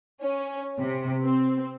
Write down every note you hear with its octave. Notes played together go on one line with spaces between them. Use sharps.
C#4
C3
C4